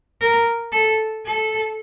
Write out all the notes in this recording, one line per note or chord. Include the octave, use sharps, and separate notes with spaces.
A#4
A4
A4